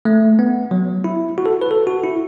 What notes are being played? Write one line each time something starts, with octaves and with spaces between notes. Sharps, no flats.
A3
B3
F#3
E4
F#4
A4
B4
A4
F#4
E4